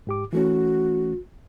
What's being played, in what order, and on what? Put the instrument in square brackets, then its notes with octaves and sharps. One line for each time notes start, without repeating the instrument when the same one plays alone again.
[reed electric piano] G#2 G4 D6
[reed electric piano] E3 A3 C#4 [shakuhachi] F#4